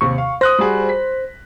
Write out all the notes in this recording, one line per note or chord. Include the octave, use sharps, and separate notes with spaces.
D#2 C3 C#6
F5
C5 D#6 F#6 A#6
G3 F#4 G#4
B6